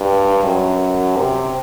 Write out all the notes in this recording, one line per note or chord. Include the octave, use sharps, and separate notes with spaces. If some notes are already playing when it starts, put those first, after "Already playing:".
Already playing: G2
F#2
C3